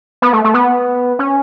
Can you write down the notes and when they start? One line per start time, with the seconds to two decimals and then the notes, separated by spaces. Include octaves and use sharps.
0.22 B3
0.33 A3
0.44 A3
0.54 B3
1.19 C#4